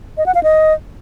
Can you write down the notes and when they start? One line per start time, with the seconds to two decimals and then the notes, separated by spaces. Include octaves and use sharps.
0.18 D#5
0.26 F#5
0.35 F5
0.43 D#5